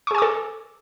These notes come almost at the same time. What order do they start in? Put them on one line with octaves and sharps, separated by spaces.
C#6 G#4 G#5 D6 A4